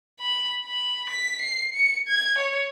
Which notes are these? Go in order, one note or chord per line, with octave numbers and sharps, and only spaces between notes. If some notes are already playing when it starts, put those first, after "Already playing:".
B5
B5
B6
C7
C#7
G#6
C#5